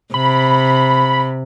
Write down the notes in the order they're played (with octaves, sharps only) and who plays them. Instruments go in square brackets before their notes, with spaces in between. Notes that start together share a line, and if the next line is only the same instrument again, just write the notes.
[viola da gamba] C3 [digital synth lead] B5